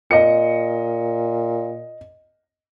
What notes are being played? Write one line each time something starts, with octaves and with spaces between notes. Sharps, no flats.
A#2 D#5 C#7